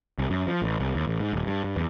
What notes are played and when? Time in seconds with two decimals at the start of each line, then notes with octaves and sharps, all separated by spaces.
0.18 C2
0.30 F#2
0.47 F3
0.62 A1
0.80 C2
0.95 D#2
1.07 A1
1.20 G#2
1.33 D#1
1.47 G2
1.64 G2
1.76 E2